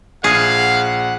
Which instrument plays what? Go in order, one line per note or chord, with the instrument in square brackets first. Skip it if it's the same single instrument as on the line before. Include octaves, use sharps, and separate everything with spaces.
[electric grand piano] A#1 C7 [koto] G#4 [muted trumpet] F5 [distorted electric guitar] F#5